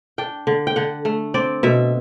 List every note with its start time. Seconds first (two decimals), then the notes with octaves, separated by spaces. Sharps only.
0.18 D4 G5
0.47 D3
0.67 G5
0.76 D3 F#5
1.05 A3
1.34 C4 D5
1.63 B2 E5